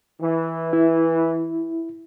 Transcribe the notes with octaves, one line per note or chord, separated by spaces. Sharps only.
E3
E4